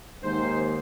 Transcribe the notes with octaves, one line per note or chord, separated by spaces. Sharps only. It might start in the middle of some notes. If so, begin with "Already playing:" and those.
D#2 G#2 C5